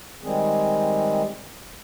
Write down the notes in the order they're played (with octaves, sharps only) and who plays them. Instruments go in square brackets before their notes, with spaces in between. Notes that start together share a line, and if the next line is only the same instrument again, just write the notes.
[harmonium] D#3 G3 G#3 C4 G#4